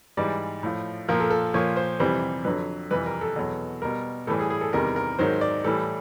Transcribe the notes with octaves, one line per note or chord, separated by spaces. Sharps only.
G#2 E3 G3 D5
A2 F3
A#2 F3 A#4
A4
A4
A#2 F3 C#5
C5
F2 C3 E3 G3 C5
F2 D3 F#3 B4
F2 C3 E3 G3 B4
A#4
A4
E2 B2 F#3
B2 G3 A#4
A2 E3 G3 A4
G#4
G#4
A4
E2 C3 D#3 G3 A#4
A#4
G#2 D#3 F#3 C5
D5
A2 E3 G3 A4